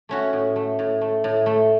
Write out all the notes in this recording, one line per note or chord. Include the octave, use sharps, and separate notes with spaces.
A3 C#4 F#4
A2
A3
A2
A3
A2
A3